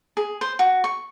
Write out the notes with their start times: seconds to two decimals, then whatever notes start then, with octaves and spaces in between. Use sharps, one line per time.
0.17 G#4
0.41 C5
0.59 F#4
0.84 C#6